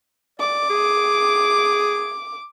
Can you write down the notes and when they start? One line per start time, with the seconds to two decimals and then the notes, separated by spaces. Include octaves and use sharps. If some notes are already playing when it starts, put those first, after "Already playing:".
0.40 D5 D6
0.70 G#4